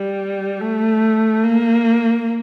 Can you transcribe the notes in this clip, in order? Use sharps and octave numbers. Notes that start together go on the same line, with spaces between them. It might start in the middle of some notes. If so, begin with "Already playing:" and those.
Already playing: G3
A3
A#3